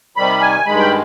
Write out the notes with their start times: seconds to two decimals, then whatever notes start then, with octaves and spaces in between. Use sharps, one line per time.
0.17 C3 D#3 G3 B5
0.41 G#5
0.66 G2 D#3 G#3 B5
0.79 G5